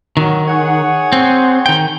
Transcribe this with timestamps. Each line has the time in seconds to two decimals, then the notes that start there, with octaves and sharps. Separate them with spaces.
0.17 D#3 F#3
0.48 G#4 C#5 F#5
1.13 C4
1.66 D#3 G5